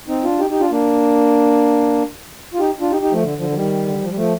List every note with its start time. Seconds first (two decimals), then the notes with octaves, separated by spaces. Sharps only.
0.08 C4 D#4
0.24 D4 F4
0.39 D#4 G4
0.50 D#4 G4
0.60 D4 F4
0.71 A#3 D4
2.54 F4
2.59 D#4 G4
2.80 D4 F4
2.91 D#4 G4
3.01 D#4 G4
3.11 F3 A3
3.22 D3
3.38 D3 F3
3.49 F3
3.54 D#3 G3
3.87 D3
3.94 D#3
4.02 F3
4.09 G3
4.17 F3 A3